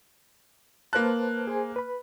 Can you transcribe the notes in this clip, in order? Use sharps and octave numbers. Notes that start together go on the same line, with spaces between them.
A#3 B4 C5 A5 F#6
G#4 C5 G#5
B4 B5